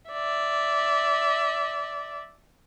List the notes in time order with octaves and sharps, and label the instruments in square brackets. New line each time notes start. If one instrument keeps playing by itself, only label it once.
[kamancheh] D5 E5